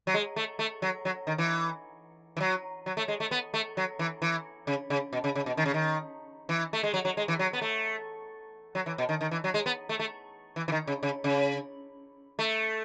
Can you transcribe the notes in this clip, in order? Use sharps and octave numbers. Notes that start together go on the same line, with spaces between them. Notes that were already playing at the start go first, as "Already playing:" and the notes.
F#3
G#3
A3
A3
F#3
F#3
D#3
E3
E3
F#3
F#3
A3
G#3
A3
B3
A3
F#3
E3
E3
C#3
C#3
B2
C#3
C#3
B2
D#3
C#3
D#3
E3
A3
G#3
F#3
F#3
G#3
E3
F#3
B3
A3
F#3
E3
B2
D#3
D#3
E3
F#3
G#3
B3
A3
A3
E3
E3
D#3
C#3
C#3
C#3
A3